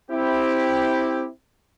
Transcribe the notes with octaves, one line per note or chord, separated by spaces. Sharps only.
C4 E4 G4